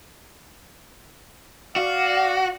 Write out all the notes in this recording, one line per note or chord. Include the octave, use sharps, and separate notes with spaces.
F#4 D5 F5